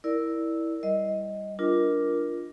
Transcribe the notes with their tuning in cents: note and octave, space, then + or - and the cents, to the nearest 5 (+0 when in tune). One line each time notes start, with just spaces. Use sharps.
E4 -10 A#4 +0 D5 +0
G3 +0 D#5 +15
D4 +0 F4 +0 A#4 +10